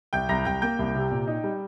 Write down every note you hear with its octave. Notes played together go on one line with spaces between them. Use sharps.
C2 G5 G6
C2 A#5 A#6
C2 G5 G6
A#3 G5 G6
C2
C3
A#2
D#4
G3